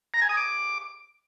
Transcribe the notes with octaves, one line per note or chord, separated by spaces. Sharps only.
A#5
G#5
D#6
D6